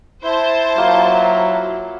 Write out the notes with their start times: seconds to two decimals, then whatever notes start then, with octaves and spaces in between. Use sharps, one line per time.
0.24 E4 C5 A5
0.77 F#3 A#3 F4